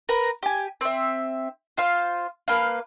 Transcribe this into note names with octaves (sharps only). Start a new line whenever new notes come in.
A#4 B4 A#5
G4 G#5
C4 E5
F4 C5 F5
A#3 B4 F5